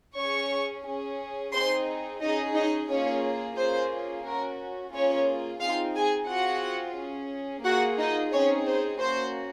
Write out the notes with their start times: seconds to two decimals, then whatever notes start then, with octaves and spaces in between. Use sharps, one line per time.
0.17 C#4 G#4 C#5 C#6
0.85 C#4 G#4
1.53 C4 D#4 G#4 C5 C6
2.21 C#4 D#4 G#4 D#5
2.55 D#4 D#5
2.89 A#3 C#4 F4 G#4 C#5
3.57 A#3 C#4 F4 G#4 C5
4.24 C#4 F#4 A#4
4.93 A#3 C#4 F4 G#4 C#5
5.60 C4 D#4 F4 G#4 F5
5.95 G#4 G#5
6.28 C4 F4 F#4 G#4 F#5
6.97 C#4 G#4
7.64 A#3 F4 F#4 G#4 F#5
7.98 D#4 D#5
8.33 C4 C#4 D#4 G#4 C#5
8.66 C5
9.00 A#3 C#4 F#4 C5